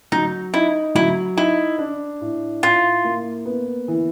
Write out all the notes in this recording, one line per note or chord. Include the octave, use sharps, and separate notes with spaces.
F#3 D#4
D#4 E4
F#3 E4
D#4 E4
D4
A2
A2 F4
A#3
B3
E3